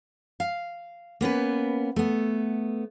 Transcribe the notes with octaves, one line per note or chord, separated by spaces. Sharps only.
F5
A#3 B3 C#4 B4
A3 B3